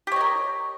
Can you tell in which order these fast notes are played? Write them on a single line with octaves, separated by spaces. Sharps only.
G4 C#5 D#5 A#4